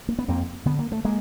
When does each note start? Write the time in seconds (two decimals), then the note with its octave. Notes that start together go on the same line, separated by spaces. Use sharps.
0.08 A#3
0.19 B3
0.28 F2 A#3 C4
0.65 D3 B3
0.79 A#3
0.92 A3
1.05 G#3 A#3